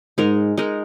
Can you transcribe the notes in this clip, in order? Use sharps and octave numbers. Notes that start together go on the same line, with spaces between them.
G#2 G#3 D#4 A#4
G#3 D#4 A#4